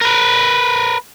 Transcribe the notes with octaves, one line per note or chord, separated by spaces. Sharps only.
A#4 B4